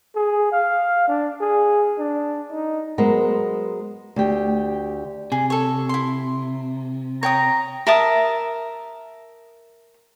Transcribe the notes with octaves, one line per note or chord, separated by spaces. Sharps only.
G#4
F5
D4
G#4
D4
D#4
F#3 G#3 B3 A#4 C5
D2 G4
C3 G#4
A4 C#5
E4 C6
C#5 G5 A#5 D#6
A#4 E5 A5 D#6